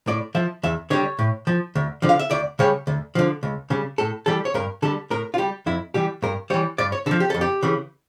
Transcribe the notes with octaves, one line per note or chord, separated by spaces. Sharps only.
A2 D5
F3 E5
E2 E5
D3 G3 C#5
A2
F3
D2
D3 F3
F5
E5
D2 D5
C#3 G3 C#5
D2
D3 F3
C#2
C#3 G3
A2 A4
E3 G3 A4
C#5
G2 A#4
D3 G3 A4
A2 A#4
F4
G3 G4
F2 E4
E3 G3 G4
G2 A#4
E3 G3 C#5
G2 D5
C#5
D3 F3 A4
G4
F2 A4
G4
C#3 E3